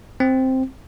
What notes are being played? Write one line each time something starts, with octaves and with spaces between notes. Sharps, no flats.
C4